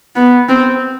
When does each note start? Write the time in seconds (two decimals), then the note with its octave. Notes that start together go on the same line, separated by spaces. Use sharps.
0.16 B3
0.49 C4